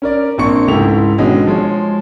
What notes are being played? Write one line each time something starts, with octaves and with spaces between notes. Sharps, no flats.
C#4 A#4 D5
A#1 A#3 C4 D4 C#6 C#7
C#2 G#2 A3 E4 G4 F7
G#1 B2 D3 G#3 C#4
F3 G#3 C#5